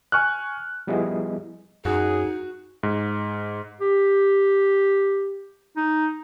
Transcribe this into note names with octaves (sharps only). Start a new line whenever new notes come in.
G#5 C#6 F6 F#6
F3 G3 B3 E4 G#4 D#5
F#2 D#4 F#4 G#4
G#2
G4
D#4